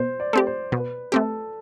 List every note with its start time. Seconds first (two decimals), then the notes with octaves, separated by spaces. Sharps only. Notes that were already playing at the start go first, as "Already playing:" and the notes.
Already playing: B2 C5
0.20 D5
0.33 A3 C4 G4
0.47 C5
0.72 B2 B4
1.12 A3 C4 G4 A4